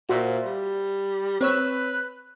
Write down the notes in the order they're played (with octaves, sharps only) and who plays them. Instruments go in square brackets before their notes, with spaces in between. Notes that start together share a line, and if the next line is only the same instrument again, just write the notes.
[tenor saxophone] A#2 [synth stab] F#4 C5 E5
[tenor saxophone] G3
[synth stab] C4 C#5 E6 [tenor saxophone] B4